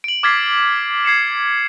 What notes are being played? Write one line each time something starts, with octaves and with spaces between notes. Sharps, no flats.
D7 F#7
D6 F6 G#6 A6 B6 C7
G#6 C7 C#7 E7